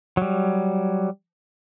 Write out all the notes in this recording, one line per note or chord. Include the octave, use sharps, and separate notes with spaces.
F#3 G3